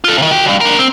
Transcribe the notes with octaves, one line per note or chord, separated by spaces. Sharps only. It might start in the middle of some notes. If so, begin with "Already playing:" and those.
F4 A4
C3 D#3
F#4 G5
B1 G2
D4 A#4
C4